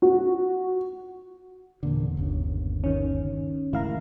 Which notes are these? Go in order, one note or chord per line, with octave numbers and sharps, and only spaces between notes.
F#4
E2 A#2 D3
G1 D#2 C#3
D#3 C#4
G#2 D#3 A3 E4 F5 A#5